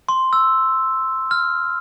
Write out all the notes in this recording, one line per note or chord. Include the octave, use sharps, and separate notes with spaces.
C6
E6
F6